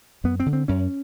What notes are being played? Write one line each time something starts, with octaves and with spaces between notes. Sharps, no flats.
F#2 B3
C4
D3
C4
F#2 C#4